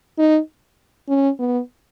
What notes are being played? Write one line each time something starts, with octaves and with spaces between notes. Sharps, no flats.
D#4
C#4
B3